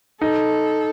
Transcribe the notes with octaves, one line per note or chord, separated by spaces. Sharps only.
D#4 A4